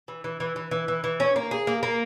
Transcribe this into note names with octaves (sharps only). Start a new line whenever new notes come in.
E3
E3
E3
E3
E3
E3
E3
C#4
A#3
G#4
A#3
A#3